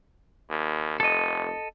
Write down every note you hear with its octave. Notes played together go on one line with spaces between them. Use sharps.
D#2
F1 A4 D#5